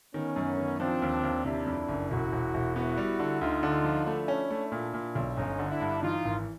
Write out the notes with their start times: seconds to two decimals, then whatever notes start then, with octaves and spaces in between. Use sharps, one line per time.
0.14 D#3 B3 C#4
0.36 F#2
0.58 D#3
0.80 F3 C4 D4
1.02 D#2
1.23 D#2
1.44 C3 D4 E4
1.67 F2
1.88 F#1
2.10 E1 E4 F#4
2.32 E1
2.54 E1
2.75 B3 E4 F#4
2.97 G3
3.19 D3
3.41 D2 D#4 F4
3.63 D3
3.85 F3
4.06 A3 D4 E4
4.28 C#4
4.50 A3
4.72 A#2
4.94 A#2
5.15 B1
5.37 G1 C#4 D#4
5.59 D3
5.69 D4 E4
5.81 G2
6.03 E3 D#4 F4
6.25 G#1